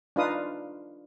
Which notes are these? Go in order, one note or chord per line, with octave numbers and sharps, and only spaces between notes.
D4 D#4 F4 B4 F5 D#6